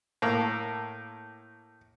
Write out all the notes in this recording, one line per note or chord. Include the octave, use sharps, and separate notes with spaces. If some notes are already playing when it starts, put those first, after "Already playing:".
A2 A#3